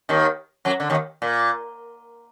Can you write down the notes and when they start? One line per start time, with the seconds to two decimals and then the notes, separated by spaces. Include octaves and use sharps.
0.09 D#2 D#3
0.65 F#2 F#3
0.80 D3
0.90 D#2 D#3
1.22 A#2